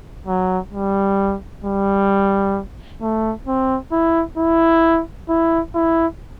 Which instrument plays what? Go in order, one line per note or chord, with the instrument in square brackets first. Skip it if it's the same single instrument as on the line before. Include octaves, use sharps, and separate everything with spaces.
[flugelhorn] F#3
G3
G3
A3
C4
E4
E4
E4
E4